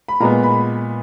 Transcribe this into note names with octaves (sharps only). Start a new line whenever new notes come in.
B5
A#2 G#3 B3 A#5
B5